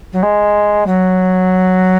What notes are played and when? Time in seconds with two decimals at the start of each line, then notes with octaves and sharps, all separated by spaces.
0.13 F#3
0.23 G#3
0.86 F#3